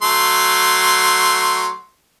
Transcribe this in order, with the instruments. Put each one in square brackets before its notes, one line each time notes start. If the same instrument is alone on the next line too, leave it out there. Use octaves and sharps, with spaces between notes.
[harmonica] F#3 A3 C6